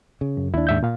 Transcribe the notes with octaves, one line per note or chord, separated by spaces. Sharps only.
C#3
F#2
D#2 D4 E4
G#2 E5 G6
A#2 F5